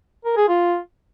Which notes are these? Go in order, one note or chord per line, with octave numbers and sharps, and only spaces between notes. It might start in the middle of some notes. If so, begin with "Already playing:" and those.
A#4
G#4
F4